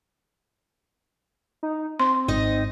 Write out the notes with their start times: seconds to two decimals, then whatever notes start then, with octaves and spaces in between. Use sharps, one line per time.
1.63 D#4
2.00 C4 C6
2.28 G#1 D#4 D#5